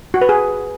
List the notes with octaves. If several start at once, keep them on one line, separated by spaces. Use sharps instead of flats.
F#4
B4
G#4